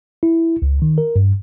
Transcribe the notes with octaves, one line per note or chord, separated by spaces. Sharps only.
E4
C#2
D#3
A#4
G2